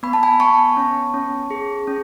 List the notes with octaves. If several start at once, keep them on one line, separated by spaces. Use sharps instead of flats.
B3 B5
A5
G#5 B5
B3 A5 C#6
C#4
C#4
G#4
C#4